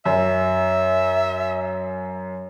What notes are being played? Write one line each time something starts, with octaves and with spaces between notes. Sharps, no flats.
F#2 E5